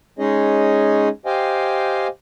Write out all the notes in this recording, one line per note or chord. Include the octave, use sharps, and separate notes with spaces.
G#3 C#4 D#4 G#4 C#5 D#5
G4 C5 D#5 F5 G5 G#5